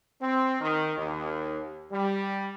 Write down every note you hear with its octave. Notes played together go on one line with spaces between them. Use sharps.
C4
D#3
D#2
G3